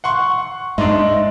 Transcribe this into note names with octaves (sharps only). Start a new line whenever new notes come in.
F#5 C6 C#6
G#2 D4 D#4 E5 C6